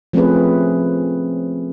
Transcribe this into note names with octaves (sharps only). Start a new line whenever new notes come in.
F3 A3 C4 C#4 G#4 B4